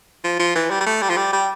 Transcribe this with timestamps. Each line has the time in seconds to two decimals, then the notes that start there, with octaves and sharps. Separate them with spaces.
0.24 F3
0.39 F3
0.55 E3
0.70 G3
0.81 G3
0.86 A3
1.02 G3
1.10 F3
1.17 G3
1.33 G3